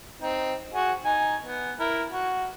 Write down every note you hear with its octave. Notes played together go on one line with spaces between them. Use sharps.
C4 D#4
F#4 G#4
D#4 G#5
B3
E4 A#4
F#4